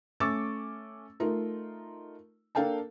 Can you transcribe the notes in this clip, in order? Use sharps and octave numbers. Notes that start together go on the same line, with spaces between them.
A3 C#4 C#6 D6 E6 A6
A3 D#4 F4 A#4
A#3 D4 A4 F5 G5 A5